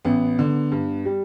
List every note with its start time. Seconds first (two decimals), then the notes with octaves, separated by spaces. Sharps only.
0.05 A1 B3
0.39 D3
0.72 G2
1.05 G3